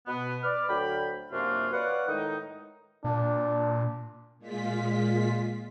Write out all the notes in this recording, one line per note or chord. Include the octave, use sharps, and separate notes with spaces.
B2 B3
B4 D5 F6
D2 F#3 D5 G5 B5
F#2 C3 A#3 C#4 D4 F4
B4 C#5 D5 F5 F#5
A2 D#3 G#3 D#4
A#2 D4
A#2 G#3 F4 B6